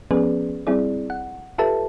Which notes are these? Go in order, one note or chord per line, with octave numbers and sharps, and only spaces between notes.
F3 B3 C#4 G#4 B4 D5
G3 C4 E4 G#4 D5
F#5
F4 G4 A4 B4 E5 A5